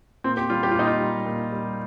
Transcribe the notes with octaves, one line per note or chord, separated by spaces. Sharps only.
A#2 C4
G4
G3 F4
G4
F4
A#2 D#4
F4
G3
A#2
G3